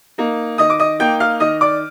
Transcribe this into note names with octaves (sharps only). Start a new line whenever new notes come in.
A#3 D#4
D#3 D#5 D#6
D6
D#5 D#6
A#3 D#4 G5 G6
F5 F6
D#3 D#5 D#6
D5 D6